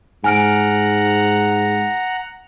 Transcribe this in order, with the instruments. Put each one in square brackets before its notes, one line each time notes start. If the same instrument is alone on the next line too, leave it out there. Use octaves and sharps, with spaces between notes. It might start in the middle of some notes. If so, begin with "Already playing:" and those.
[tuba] G#2 [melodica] F#5 A#5 [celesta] G#5 F6 D7